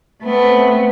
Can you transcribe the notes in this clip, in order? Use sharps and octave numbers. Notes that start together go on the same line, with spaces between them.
A3 B3 C4